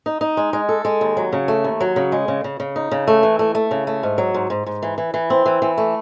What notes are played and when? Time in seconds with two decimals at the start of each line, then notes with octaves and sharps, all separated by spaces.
0.06 D#4
0.21 D#4
0.37 G#3
0.53 G#3
0.69 A4
0.85 G#3
1.01 D#2
1.17 F#3
1.33 C#3
1.48 A3
1.64 D#2
1.80 F#3
1.96 C#3
2.12 G#3
2.28 C#3
2.44 C#3
2.60 C#3
2.76 D#4
2.91 C#3
3.07 A3
3.23 E3
3.39 A3
3.55 A3
3.71 C#3
3.87 A3
4.03 G#2
4.18 F#3
4.34 G#2
4.50 G#2
4.66 G#2
4.83 E3
4.98 E3
5.14 E3
5.30 C4
5.46 E3
5.62 E3
5.78 A3